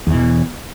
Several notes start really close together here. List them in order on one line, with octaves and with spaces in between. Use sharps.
E2 E3 B2